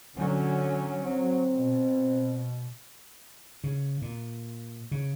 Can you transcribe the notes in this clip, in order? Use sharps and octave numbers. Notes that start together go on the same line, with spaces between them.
D3 F#3 C#4
F#3 C4
B2
C#3
A#2
C#3